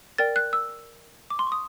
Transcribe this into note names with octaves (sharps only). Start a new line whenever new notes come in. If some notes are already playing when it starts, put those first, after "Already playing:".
A#4 D5 G5 A6
F#6
E6
D6
C6
C#6
D#6